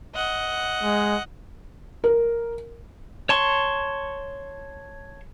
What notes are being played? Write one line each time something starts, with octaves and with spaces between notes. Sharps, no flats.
D#5 F#5
G#3
A#4
C#5 A5 C6 C#6